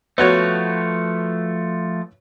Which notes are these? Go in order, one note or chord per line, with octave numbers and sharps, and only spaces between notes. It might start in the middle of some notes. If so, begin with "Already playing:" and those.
F3 A3 B3 F#4 C#5